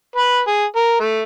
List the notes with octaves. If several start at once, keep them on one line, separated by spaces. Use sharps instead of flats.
B4
G#4
A#4
A3